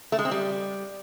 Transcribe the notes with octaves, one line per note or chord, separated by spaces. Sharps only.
A3
G#3
C4
G3